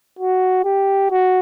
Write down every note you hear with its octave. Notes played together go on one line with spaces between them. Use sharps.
F#4
G4
F#4